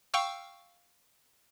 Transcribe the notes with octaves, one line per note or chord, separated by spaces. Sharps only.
F5 G5 C#6 E6